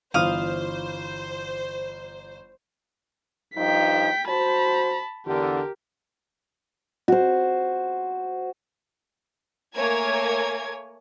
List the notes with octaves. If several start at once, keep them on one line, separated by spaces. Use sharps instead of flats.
G1 E3 F4 C5 F5 D#6
G2 F3 D#4 G5 B6
F#4 C5 A5 B5
E2 D3 G4 A#4
F#4 C5
A3 A#3 A#4 C#5 G#5 G#6